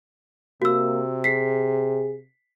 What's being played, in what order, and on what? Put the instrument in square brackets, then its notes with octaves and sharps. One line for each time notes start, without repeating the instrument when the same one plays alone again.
[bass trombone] C3 [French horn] A#3 [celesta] F#4 E6
[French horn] G#4 [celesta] B6 C7